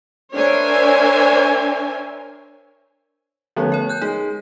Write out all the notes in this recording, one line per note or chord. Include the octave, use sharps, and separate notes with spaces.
D4 A#4 C5 C#5 E5 G#5
D3 F3 A3 B3 C#4
A#4 C#5
F#6 G6
G#3 D#4